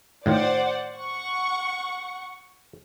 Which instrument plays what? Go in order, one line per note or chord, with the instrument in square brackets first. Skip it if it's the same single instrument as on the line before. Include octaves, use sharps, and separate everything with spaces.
[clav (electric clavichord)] A2 D#3 F4 [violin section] C5 D5 F#5
[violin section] F#5 C#6